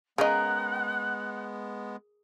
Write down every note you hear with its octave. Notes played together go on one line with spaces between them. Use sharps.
C#3 G#3 B3 G#4 A#4 D#5 F#5 B5